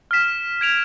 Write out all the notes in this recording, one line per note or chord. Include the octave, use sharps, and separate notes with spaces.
F6 B6 E7
G#6 D7 F7